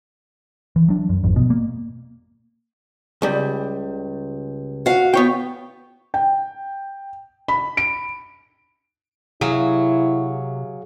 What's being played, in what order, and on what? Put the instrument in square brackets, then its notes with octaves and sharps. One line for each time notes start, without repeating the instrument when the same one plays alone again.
[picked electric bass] E3
F#3 D4
F#2
G#1 F2
B2
A#3
[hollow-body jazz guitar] C#2 G3
[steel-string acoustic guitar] F#4 F5
[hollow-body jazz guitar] B3 C#5 G5
[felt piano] G5
B5
D7
[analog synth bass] C3 [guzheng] F#3 [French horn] E4 [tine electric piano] G#4 F5